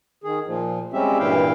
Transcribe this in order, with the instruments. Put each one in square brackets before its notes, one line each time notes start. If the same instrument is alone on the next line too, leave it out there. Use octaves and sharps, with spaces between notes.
[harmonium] D#3 G#4
A#2 F3
G3 G#3 C4 C#4 G4 E5
G2 A#2 E3 E4 F5 G5